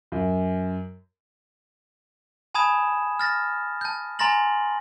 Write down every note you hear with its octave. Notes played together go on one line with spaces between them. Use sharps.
F#2
G#5 A5 B5 D#6 G#6 E7
F6 A6 A#6
A5 G6
G#5 A#5 C6 A6 A#6 F#7